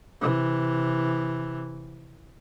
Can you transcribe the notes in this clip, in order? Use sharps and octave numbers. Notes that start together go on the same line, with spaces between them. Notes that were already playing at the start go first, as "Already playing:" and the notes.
C3 E3